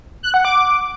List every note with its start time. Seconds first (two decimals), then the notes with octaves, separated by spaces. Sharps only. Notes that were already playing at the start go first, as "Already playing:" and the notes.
0.23 F#6
0.34 F#5
0.45 D6